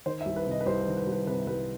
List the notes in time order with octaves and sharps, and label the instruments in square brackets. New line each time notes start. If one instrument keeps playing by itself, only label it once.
[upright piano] D#3 C5
E5
C2
B4
C3 D#5
B4
C2 C5
B4
D#3
B4
C2 B4
C3 B4
C2 B4